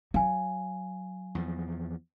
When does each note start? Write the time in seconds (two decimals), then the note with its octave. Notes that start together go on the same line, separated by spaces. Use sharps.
0.14 F#3 F5 G#5
1.35 E2 F3